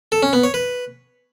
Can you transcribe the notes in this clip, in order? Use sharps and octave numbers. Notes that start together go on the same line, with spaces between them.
A4
C#4
B3
C#5
B4